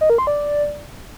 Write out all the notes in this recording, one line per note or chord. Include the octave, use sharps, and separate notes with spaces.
D#5
A#4
C6
D5